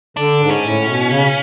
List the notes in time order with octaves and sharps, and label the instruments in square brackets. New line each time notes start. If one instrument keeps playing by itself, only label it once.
[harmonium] D3 [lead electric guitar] D4
[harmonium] G#2
[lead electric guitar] C#4
[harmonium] A2
B2
C#3